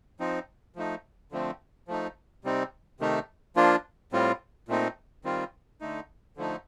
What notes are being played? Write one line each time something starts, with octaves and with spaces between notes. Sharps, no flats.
F3 C4 D#4
F3 A3 D#4
D3 F3 A3 C4
F3 A3 D#4
C3 G3 C4 D#4
C3 D#3 A3 D#4
F3 A#3 D4 F4
A2 G3 C4 F4
A#2 A3 C4 D#4
D#3 G3 C4 F4
D3 A3 D#4
D3 F3 A3 D#4